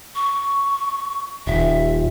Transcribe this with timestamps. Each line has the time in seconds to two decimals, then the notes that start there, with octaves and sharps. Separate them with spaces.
0.15 C#6
1.47 D#1 E5